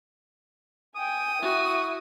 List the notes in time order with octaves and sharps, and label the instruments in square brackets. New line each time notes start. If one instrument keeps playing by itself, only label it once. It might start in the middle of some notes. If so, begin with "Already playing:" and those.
[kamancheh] G5 G#5 [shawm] D#6
[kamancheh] E4 [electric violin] F#4